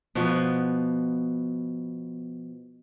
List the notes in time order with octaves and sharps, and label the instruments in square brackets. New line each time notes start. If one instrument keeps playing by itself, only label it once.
[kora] B2 F3 B3